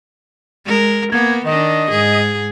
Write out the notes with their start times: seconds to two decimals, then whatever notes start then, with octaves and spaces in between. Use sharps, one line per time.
0.65 G#3 A#4
1.12 A#3 B3 G#6
1.45 D#3 D4 D#5
1.90 G#2 G#4